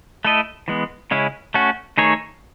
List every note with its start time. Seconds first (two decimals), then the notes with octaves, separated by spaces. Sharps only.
0.25 A3 E4 A4 D#5
0.68 E3 G#3 B3
1.11 C#3 G#3 C#4 E4
1.54 A3 C#4 F#4
1.98 D#3 A3 D#4 G#4 C#5